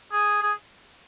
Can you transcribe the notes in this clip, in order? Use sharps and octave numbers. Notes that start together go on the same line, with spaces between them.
G#4
G#4